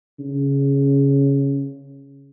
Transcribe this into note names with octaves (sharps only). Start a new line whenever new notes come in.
C#3